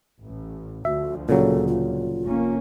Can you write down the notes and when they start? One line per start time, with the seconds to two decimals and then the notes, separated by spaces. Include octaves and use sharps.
0.20 A1
0.85 D2 F3 F#4 E5
1.29 A#2 C#3 F#3 A4
1.68 F4
2.24 F1 A#3 C#4